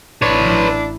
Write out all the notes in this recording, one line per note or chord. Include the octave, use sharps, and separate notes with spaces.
A1 D4 E4 B4 C#5